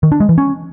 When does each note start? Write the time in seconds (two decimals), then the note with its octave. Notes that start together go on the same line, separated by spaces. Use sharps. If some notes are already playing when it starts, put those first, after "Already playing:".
0.03 D#3
0.12 D4
0.20 G#3
0.29 E3
0.38 C#4